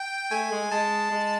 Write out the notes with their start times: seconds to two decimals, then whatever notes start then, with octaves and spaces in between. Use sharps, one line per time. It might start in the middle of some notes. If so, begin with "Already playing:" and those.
Already playing: G5
0.31 A3 G#5
0.51 G#3
0.71 G#3 A5
1.11 G#3